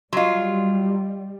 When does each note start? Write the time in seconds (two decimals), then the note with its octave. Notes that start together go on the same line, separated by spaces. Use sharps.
0.13 F#3 G3 F4 D#5 C6